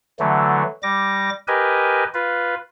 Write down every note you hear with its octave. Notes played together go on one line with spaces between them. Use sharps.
D3 E3 F#3 A3
G3 D6 A#6
G4 A#4 B4 D#5 G#5
F4 B4